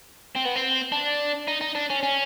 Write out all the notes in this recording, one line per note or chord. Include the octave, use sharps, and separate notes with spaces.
C4
B3
C4
D4
D#4
D#4
D4
C#4
C#4